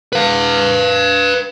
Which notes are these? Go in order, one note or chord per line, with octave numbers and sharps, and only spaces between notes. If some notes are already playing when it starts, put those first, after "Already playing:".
B4 F5